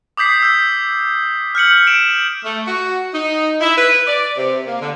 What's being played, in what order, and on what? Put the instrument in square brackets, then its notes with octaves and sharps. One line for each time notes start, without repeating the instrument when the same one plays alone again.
[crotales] D6 D#6 G6 B6 C7
E6 G6
F6 G6 C#7 F#7
D7 E7
[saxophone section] A3
F#4
D#4
E4
B4
D5
C3
A#3
D3